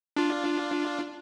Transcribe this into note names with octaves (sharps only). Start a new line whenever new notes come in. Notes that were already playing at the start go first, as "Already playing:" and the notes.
D4 F4